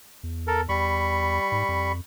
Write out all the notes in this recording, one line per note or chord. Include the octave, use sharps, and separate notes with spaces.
E2
A4 A#4
E2 G3 B5 C#6
G#2
F2